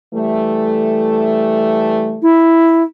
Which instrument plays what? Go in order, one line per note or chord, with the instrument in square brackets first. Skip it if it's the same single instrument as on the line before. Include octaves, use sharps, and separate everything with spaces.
[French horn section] E3 G3 A3
[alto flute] E4